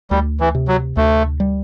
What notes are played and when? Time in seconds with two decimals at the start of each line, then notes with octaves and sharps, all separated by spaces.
0.11 D2 G3
0.40 E3
0.55 C3
0.68 F#3
0.97 D2 A3
1.40 G3